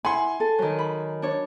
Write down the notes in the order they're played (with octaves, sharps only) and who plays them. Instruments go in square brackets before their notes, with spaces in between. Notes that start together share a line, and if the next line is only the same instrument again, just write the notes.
[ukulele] E4 F#5 B5 [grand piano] G#5 C6
[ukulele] A4
[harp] D#3 F#3
B5
D4 C#5